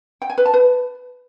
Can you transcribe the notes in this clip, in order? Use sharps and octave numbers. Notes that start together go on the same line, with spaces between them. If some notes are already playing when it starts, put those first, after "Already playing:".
G5
G#5
B4
A5
B4